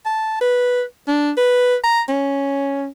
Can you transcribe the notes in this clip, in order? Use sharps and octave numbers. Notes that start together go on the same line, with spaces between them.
A5
B4
D4
B4
A#5
C#4